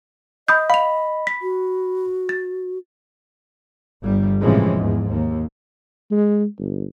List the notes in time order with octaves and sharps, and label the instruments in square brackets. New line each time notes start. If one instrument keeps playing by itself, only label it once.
[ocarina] D#5 [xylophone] B5 D#6 G6
[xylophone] F5 F7 [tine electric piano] B5
[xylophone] B6
[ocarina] F#4
[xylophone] A6
[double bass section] G1 G3
A2 C3 E3 F3 G#3 C#4
E2 G#2
D#2
[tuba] G#3
G1